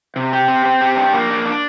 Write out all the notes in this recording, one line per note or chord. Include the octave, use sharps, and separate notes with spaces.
C3
G4
C4
C4
G4
D4
A#3
D4
D4